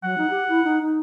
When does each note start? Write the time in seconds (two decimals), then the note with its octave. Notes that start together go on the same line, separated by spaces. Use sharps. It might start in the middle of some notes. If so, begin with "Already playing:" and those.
0.03 F#3 F#5
0.18 D#4
0.30 G4
0.49 E4
0.64 D#4
0.82 D#4